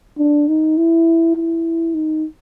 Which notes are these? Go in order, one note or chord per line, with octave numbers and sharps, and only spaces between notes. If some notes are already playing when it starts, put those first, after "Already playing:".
D4
D#4
E4
E4
D#4